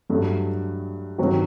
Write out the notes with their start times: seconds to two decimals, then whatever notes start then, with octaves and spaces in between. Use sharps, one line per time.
0.10 G2 F#3 A3
1.18 G2 D#3 F#3 C4 F#4